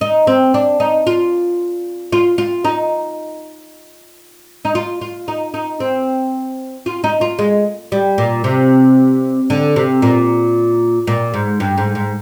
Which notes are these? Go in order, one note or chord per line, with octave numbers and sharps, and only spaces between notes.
D#4
C4
D4
D#4
F4
F4
F4
D#4
D#4
F4
F4
D#4
D#4
C4
F4
D#4
F4
G#3
G3
A#2
C3
D3
C3
A#2
A#2
G#2
G2
G#2
G#2